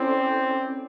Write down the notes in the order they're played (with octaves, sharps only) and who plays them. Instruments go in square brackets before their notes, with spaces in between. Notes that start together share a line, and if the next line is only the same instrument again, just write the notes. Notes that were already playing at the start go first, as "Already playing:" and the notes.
Already playing: [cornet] C4 [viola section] C#4 E4 A4 D5